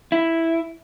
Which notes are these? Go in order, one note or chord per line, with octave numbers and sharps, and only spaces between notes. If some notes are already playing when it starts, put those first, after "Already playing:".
E4